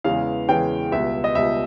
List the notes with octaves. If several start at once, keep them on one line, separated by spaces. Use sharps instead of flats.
E2 C#3 E3 G#3 F5
E2 C#3 E3 G#3 G5
C#2 B2 G3 E5
D#5
C#2 B2 G3 E5